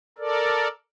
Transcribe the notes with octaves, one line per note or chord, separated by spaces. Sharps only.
A4 A#4 D5